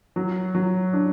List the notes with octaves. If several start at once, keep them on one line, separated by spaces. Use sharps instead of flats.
F#3
F#3
D4